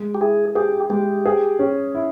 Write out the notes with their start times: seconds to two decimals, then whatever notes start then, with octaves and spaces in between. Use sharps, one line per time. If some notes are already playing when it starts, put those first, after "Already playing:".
Already playing: G#3
0.14 G4
0.20 E4 G#4
0.55 G4 G#4
0.90 G#3 G4
1.26 G#4
1.59 C#4
1.95 E4